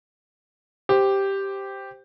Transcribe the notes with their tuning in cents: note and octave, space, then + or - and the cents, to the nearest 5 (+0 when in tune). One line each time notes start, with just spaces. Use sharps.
G4 +0 C5 -5